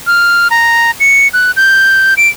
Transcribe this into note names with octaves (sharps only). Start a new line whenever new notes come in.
F6
A#5
C#7
F#6
G6
D7